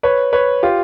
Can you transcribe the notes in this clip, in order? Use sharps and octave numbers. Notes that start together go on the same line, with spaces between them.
B4 C#5
B4 C#5
F4 G4